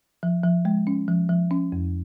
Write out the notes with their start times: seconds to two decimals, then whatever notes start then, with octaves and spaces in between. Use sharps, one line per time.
0.23 F3
0.44 F3
0.65 G#3
0.87 C#4
1.08 F3
1.29 F3
1.51 C#4
1.72 F2